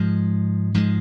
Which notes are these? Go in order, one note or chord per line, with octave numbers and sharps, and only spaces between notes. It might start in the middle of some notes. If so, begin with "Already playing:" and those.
Already playing: G#2 F3 G#3
G#2 F3 G#3